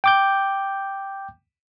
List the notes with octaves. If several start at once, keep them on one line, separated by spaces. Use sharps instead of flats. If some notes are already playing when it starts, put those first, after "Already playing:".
G5 D6 G6